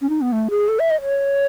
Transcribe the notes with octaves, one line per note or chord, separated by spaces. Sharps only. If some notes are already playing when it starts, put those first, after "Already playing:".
C#4
D#4
B3
A3
G#4
A4
E5
D#5
C#5